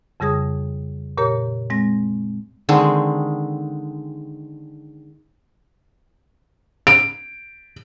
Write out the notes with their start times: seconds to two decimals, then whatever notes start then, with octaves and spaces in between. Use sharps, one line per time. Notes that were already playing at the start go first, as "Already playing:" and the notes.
0.20 F2 C#3 G3 G#4 D#6
1.17 A#2 G4 A#4 C#5 A#5
1.70 G#3 C4 A#6
2.69 D3 D#3 G#3 C4
6.87 D7